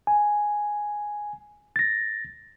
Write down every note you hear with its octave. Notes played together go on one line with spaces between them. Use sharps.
G#5
A6 A#6